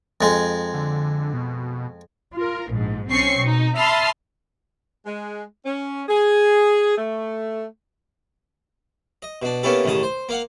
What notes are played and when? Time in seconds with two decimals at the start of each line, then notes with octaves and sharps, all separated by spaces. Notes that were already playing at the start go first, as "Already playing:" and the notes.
0.21 F2 G#3
0.74 D3
1.33 B2
2.35 F4 A#4
2.71 A#1 G#2
3.10 B1 C4 C#4 C#6 C7
3.39 B2 D#4
3.76 E5 A5 B5 C6 D#6 F6
5.06 G#3
5.65 C#4
6.08 G#4
6.98 A3
9.22 D#5
9.42 B2 D4
9.63 A#3 B3 C#4 E4 G4 A4
9.84 A1 D#2 C#3 A5 D#6
10.03 C5
10.29 A#3 F5 F#5